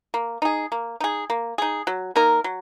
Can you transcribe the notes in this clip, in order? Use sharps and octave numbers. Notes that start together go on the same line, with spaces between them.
A#3
D#4 G#4
A#3
D#4 G#4
A#3
D#4 G#4
F#3
A#3 D#4 A#4
F#3